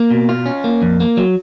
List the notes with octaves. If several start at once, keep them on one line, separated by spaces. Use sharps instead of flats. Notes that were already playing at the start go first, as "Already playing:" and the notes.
Already playing: A#3
B2
F4
C#4
A#3
F2
A#3
F#3